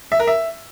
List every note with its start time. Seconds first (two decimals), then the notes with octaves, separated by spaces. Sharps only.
0.12 E5
0.19 A#4
0.27 E5